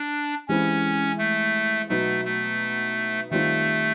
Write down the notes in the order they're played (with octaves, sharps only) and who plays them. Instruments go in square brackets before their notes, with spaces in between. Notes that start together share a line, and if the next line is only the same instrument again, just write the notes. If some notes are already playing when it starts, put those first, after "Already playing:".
Already playing: [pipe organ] D4
[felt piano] E3 G#3 C4 E4 G4 [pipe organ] C#4
[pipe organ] A3
[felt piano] B2 F#3 B3 D#4 [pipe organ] A3
[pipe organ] A3
[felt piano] D#3 G3 C4 F4 [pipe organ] A3